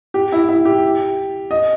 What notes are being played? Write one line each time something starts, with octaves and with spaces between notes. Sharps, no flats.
G4
E4
E4
G4
D#5